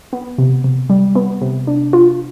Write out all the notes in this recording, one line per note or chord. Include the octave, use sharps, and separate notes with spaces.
B3
C3
C3
G3
B3
C3
D4
F4